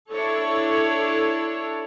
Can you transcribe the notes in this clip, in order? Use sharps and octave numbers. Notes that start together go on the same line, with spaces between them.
D4 E4 A4 C#5